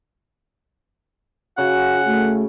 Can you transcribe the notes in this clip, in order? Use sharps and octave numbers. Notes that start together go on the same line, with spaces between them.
C#3 F#4 F#5
A3 F#4